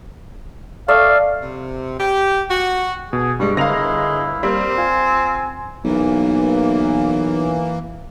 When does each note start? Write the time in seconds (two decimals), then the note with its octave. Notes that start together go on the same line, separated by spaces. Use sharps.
0.88 A3 D5 E5 F5
1.42 C3
2.00 G4
2.51 F#4
3.13 B2 G#4
3.40 G2 G3 G#3 C#6
3.57 G1 G#3 E4 A#4 F5 A#6 F7
4.43 G3 A#3 C4
4.78 F4 G#5
5.84 B1 E3 A#3